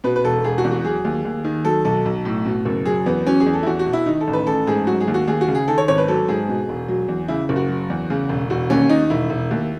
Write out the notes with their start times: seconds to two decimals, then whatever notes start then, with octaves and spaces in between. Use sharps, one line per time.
0.04 B2 B4
0.16 B4
0.24 E1 A4
0.44 E1 G#4
0.58 F#4
0.64 E2
0.71 F#4
0.85 F#3 G#4
1.05 D#2
1.25 D#2
1.44 D#3
1.65 F#3 A4
1.85 B1 A4
2.05 B1
2.25 A2
2.46 B2
2.66 F#1
2.86 F#3 G#4
3.06 E2 B3
3.26 F#3 C#4
3.40 G#4
3.46 E2
3.53 A4
3.63 E4
3.66 E2 F#4
3.79 F#4
3.86 B2
3.93 E4
4.06 D#3 D#4
4.21 A4
4.27 A1
4.33 B4
4.47 A1 A4
4.67 G#2 G#4
4.87 F#3 F#4
5.01 G#4
5.08 D#2
5.14 F#4
5.28 D#2 G#4
5.41 F#4
5.48 C#3
5.55 G#4
5.68 D#3 A4
5.78 C#5
5.88 G#1 C#5
5.98 B4
6.08 F#3 A4
6.28 G#2 G#4
6.48 B2
6.69 E1
6.88 F#3
7.08 E2
7.28 C#3 E4
7.49 F#1
7.56 F#4
7.69 F#3
7.90 E2
8.10 C#3
8.29 E1
8.50 E1 F#4
8.70 D#2 C#4
8.89 D#3 D#4
9.10 E1 E4
9.30 E1
9.51 D#2